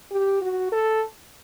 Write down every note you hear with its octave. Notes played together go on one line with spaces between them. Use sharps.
G4
F#4
A4